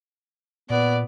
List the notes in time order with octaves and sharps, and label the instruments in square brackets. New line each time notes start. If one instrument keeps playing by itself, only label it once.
[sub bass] A#2 [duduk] B3 [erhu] D5